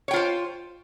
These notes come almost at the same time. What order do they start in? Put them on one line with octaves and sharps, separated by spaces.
C#5 G5 F4 C5